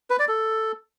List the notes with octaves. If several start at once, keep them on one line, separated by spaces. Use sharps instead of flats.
B4
D5
A4